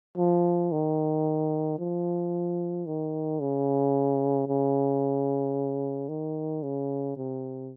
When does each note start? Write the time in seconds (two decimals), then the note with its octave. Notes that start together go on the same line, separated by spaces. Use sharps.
0.17 F3
0.72 D#3
1.79 F3
2.86 D#3
3.40 C#3
4.48 C#3
6.09 D#3
6.63 C#3
7.16 C3